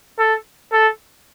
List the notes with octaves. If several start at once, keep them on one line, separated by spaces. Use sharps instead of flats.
A4
A4